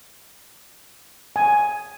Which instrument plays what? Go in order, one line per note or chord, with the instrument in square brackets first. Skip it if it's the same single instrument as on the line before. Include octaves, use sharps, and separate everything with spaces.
[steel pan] G#5